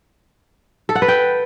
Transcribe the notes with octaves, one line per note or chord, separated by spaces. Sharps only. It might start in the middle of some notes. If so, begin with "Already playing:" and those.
A4
F#5
B4
G5